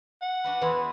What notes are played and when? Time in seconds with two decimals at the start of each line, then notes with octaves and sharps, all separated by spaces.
0.22 F#5
0.44 D4 F#4 B4
0.61 E2 E3 G#4 B4 B5 C6